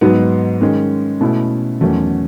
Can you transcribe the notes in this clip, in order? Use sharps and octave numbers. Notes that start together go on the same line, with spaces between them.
G#2 F#3 B3 D#4
D#3 G#3 C#4
B2 A3 C#4 E4
E2 D#3 F#3 A3 C#4